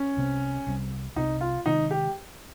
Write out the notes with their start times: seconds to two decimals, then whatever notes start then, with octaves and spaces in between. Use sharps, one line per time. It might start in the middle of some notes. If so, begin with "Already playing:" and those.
Already playing: C#4
0.17 C2 C3 G3 C4
0.67 C2 C3 G3 C4
1.16 C2 C3 G3 C4 D#4
1.41 F4
1.66 C3 D#3 G#3 D#4
1.91 G4